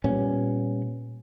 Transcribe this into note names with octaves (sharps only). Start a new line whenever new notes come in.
A#2 G3 B3 C#4